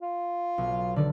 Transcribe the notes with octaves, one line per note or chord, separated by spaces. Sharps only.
F4
B1
D3 D#3 D5